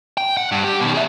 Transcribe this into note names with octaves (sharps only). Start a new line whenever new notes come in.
G5
F#5
G2
G4
B2 D#3
G#4 E5